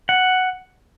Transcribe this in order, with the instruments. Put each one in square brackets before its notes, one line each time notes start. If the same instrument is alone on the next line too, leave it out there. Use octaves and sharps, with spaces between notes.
[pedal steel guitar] F#5